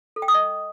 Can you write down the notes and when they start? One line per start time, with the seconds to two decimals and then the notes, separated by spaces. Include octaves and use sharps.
0.16 A4
0.22 G5
0.28 D#6
0.34 D#5